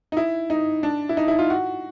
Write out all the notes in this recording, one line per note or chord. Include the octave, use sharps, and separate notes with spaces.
D#4
E4
D#4
D4
E4
D#4
E4
F4
F#4